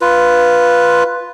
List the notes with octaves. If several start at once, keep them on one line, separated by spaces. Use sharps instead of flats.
F4 B4